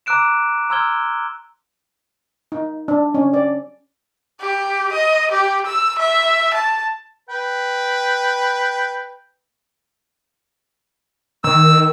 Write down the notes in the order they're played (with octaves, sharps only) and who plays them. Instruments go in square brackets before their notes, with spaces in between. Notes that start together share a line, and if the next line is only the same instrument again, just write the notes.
[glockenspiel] A#5 D6 E6 F#6 D7 E7
A#5 C6 E6 F6 G#6 G7
[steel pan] D#4
D4
C#4
D5
[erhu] G4
D#5
G4
E6
E5
A5
[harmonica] B4 G5
[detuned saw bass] D#3 [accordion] E6